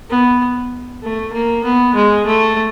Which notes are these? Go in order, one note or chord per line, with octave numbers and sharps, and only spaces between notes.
B3
A3
A#3
B3
G#3
A3